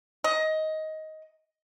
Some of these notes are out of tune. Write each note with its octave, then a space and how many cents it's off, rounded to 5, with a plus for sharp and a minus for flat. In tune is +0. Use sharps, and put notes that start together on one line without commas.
D#5 +15